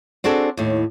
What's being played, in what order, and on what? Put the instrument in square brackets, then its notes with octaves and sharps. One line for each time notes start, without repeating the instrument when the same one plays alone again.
[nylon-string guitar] C4 D4 F#4 G#4 A4
D#2 A2